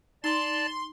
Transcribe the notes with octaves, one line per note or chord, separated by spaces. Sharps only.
D#4 D5 A5 A#5 C6 E6 A6